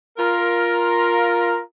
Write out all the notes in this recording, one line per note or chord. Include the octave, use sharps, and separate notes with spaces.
F4 A#4